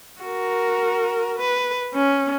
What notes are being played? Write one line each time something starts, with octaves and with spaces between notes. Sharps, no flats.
F#4 A#4
B4
C#4